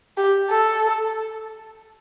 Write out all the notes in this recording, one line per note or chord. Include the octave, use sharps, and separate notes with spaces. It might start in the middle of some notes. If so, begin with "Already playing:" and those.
G4
A4